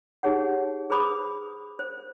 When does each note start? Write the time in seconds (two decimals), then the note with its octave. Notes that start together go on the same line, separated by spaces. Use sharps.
0.23 D#4 G4 G#4 C#5 F#5
0.90 G#4 B4 C5 B5 D6 D#6
1.79 C5